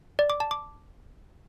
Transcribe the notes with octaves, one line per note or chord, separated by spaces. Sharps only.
D5
D6
A5
D6